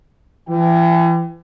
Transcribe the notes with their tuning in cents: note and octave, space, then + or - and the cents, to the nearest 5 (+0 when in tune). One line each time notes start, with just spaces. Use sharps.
E3 +40 G5 -10